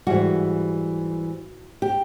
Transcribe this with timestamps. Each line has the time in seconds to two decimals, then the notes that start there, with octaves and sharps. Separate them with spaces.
0.07 G#2 E3 G3 F#4
1.82 G4